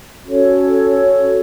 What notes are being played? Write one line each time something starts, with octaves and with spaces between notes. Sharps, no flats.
C#4 F#4 A4 C#5